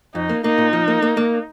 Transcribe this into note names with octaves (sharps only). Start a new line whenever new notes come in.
F2 D#4
A#3
A#3 D#4
A#2
F3
A#3
A#3
A#3